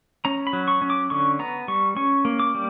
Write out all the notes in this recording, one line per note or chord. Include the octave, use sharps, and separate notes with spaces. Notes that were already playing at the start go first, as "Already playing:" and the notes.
C#4 A#5
B5
F#3
C#6
C#4
D6
D3 C#6
B3 A#5
G3 C#6
C#4 C#6
A#3
D6
G3